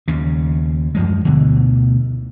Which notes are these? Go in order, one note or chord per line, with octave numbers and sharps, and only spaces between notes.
D#2 C#3
F#2 F3 G#3
D2 B2 D3